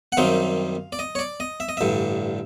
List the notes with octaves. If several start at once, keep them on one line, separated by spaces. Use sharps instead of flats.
F#5
F#2 D#3 G3 C4 D#4 F5
D5
D#5
C#5
D5
D#5
E5
D#5
A1 G2 D3 E5